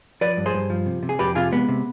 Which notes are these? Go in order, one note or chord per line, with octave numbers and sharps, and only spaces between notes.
F3 B4 D5
G2
G#4 C5
G2
F3
C3
C3
G#4
F2 G4 B4
C3 F4 G#4
G#3 B3
C3